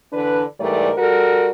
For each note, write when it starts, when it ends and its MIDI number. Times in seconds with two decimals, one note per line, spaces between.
0.13 0.43 50
0.13 0.43 52
0.13 0.43 62
0.13 0.43 71
0.60 0.91 44
0.60 0.91 52
0.60 0.91 55
0.60 0.91 57
0.60 0.91 70
0.60 0.91 74
0.97 1.50 55
0.97 1.50 66
0.97 1.50 69
0.97 1.50 70